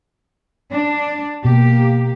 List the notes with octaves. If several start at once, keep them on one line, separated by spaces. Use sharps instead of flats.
D4
B2 A#3 G4